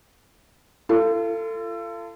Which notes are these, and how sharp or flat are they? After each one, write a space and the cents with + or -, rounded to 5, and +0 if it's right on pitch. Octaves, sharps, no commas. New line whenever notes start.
F4 -35 A4 +25